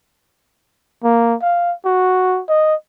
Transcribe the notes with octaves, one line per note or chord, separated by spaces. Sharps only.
A#3
F5
F#4
D#5